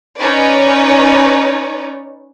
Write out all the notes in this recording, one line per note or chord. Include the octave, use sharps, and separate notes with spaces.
C#4 D#4 B4 C#5 D5